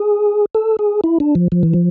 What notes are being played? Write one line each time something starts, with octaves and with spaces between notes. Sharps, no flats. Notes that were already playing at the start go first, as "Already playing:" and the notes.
Already playing: G#4
A4
G#4
E4
D4
F3
F3
E3
F3